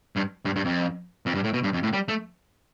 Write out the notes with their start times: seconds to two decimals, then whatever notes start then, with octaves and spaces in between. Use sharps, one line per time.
0.16 G2
0.45 G2
0.56 G2
0.65 F2
1.26 F2
1.35 G2
1.44 A2
1.53 B2
1.63 G2
1.73 F2
1.83 A2
1.93 G3
2.08 A3